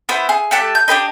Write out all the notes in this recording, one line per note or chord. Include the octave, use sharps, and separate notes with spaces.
B3 E4 C5
G#4
A3 G4 A5 F#6
G6
D4 G4 B4 D#5